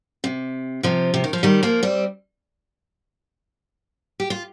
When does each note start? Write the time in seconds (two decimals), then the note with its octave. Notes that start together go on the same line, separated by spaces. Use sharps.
0.24 C3
0.83 C3 F3
1.14 C3
1.24 D#3
1.33 F3
1.43 D#3 G3
1.63 F3 A#3
1.83 G3 C4
4.20 G4
4.30 F4